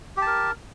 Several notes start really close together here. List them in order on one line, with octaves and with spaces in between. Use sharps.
G4 A5 A#4